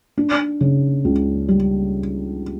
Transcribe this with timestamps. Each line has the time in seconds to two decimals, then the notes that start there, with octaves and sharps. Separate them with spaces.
0.17 D4
0.61 C#3
1.05 C#2
1.48 G3